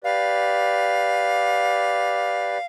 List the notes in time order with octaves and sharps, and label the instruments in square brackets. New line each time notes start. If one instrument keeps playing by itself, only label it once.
[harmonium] G4 B4 D5 [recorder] F5